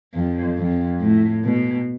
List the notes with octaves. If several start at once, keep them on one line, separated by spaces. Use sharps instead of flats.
F2
F2
A2
B2